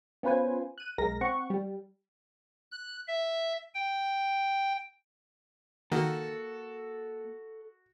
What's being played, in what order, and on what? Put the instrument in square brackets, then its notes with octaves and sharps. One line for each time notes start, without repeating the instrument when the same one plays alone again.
[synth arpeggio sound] B3 C#4 F4 B4 C5 G#5
F#6 D#7
B1 G#3 A#4 A#6
C4 F#5 C#6
G3
[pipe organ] F#6
E5
G5
[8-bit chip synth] D#3 [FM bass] A#3 [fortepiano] F#4 [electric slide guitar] A4